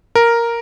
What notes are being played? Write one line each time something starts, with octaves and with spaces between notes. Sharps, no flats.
A#4